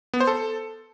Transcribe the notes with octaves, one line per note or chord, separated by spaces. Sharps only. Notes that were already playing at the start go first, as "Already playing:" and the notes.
B3
C5
A4